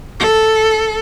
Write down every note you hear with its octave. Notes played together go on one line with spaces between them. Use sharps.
A4